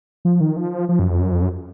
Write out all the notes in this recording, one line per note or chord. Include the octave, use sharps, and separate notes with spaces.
F3
D#3
F3
F3
F#2
F2
F#2
F2
F#2